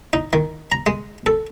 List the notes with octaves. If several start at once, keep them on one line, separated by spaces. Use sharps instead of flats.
D#4
D#3
A#5
G#3
A4